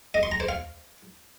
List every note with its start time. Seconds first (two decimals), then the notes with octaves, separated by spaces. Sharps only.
0.14 D#5
0.23 C6
0.31 A#5
0.40 C5
0.49 F5